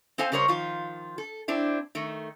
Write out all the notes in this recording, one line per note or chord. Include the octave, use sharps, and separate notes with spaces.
C4 A4 C5 F5 G#5
C#3 G3 A#4 C5 C#5
D#3 F3 F4
A4
C4 D4 E4
D#3 A3